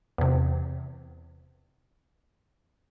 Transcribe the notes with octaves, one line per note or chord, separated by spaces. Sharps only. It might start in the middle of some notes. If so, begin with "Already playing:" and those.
E2 C3